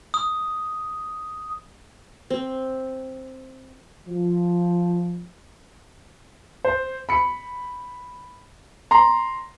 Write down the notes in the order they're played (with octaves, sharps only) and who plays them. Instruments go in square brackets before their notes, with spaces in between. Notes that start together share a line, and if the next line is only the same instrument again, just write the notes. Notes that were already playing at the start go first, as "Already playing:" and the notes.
[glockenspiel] D#6
[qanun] C4
[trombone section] F3
[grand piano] C5
B5 C#7
A#5 C6